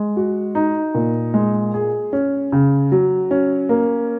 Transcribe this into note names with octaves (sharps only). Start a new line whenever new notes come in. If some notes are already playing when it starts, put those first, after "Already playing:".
Already playing: G#3
F#4
D#4
A#2
G#3
G#4
C#4
C#3
F#3
C#4
A#3